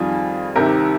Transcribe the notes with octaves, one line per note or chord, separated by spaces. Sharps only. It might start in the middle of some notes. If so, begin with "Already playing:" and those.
Already playing: F2 D#3 G3 F4 G#4
C2 C3 D#3 G4 A#4